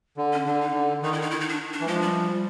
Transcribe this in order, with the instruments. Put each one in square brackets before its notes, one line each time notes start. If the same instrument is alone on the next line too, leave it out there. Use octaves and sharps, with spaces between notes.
[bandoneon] D3
[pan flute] C#4
[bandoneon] D3 [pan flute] D4
[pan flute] D#4
[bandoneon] D3
[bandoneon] D#3 [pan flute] D#4
[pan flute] E4
[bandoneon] D#3
[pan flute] D#4
E4
D#4
D4
D4
[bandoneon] E3
[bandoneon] F3 [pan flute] G#3
[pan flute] G3